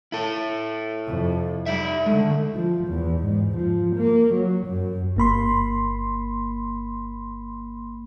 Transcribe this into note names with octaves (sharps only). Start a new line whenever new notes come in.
E4 A4
F2 C3
G3 D#4 E5
D3 G#3 A3
F3
E2
G#2
F3
A#3
F#3
F#2
G1 A#3 B5 C6